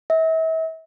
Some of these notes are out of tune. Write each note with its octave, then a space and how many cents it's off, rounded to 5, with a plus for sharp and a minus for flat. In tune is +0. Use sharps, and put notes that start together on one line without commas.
E5 -40